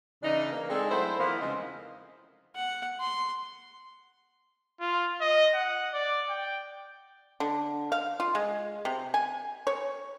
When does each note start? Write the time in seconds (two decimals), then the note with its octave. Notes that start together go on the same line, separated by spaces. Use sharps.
0.23 C#3 E3 D4 D#4
0.52 A#3
0.70 G#3 C4 D4 D#4 G#4 A4
0.91 F#3 A3 E4 C5
1.20 E2 E3 F3 A#3
1.40 C#3 F3 G#3 C4 D#4
2.55 F#5
3.01 C6
4.80 F4
5.21 D#5
5.54 F#5
5.94 D5
6.30 G5
7.40 D3
7.92 F5
8.20 F4
8.35 G#3
8.85 C3
9.14 G#5
9.67 C#5